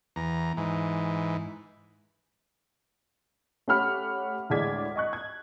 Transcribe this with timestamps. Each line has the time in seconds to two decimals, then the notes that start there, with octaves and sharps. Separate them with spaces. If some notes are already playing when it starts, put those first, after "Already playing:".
0.16 E2 A#5
0.57 G#2 E3
3.68 A3 C#4 G4 F#5 B5 F6
4.50 D2 A2 G#3 D5 G#6 B6
4.96 D#5 C#6 F#6
5.13 G#6